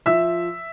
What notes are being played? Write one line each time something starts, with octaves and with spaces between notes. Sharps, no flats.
F3 E5 E6